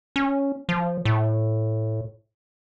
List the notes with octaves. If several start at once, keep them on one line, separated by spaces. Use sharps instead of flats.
C#4
F3
A2